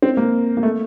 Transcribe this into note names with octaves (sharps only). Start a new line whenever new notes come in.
C4
A#3
A#3
A3